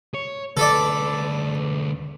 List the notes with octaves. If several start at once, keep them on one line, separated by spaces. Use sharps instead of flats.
C#5
D2 A4 B4 D5